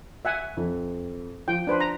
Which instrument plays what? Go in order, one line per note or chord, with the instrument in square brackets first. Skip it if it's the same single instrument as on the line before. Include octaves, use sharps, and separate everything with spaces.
[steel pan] E5 F#5 G#5
[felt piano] F2
[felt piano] F3 [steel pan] G5
[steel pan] D4 B4 C5
A#5